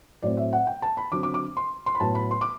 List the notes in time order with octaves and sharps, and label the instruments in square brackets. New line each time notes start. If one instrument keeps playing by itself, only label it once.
[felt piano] A2 F#3 A3 C4 D5
E5
F#5
G5
A5
B5
D3 F#3 C4 D6
D6
D6
C6
C6
B5
A2 F#3 B3 A5
B5
C6
D6